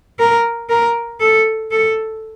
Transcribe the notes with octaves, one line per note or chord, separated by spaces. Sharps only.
A#4
A#4
A4
A4